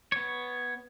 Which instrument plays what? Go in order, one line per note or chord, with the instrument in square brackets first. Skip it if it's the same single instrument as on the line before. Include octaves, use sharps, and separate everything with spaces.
[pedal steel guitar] B3 C#5